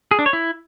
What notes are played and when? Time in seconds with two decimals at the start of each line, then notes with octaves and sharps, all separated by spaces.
0.11 G#4
0.19 D4
0.26 C#5
0.33 E4